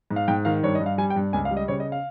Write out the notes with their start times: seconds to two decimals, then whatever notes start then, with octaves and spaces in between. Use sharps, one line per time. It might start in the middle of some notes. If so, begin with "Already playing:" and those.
0.10 G#2
0.16 F5
0.28 G#2 G5
0.45 D#3 F5
0.63 G2 C#5
0.75 D#5
0.80 G2
0.86 F5
0.98 G3 G#5
1.10 G5
1.16 G2
1.33 C#2 G#5
1.45 F5
1.51 G3
1.57 D#5
1.68 C#3 C#5
1.80 D#5
1.92 F5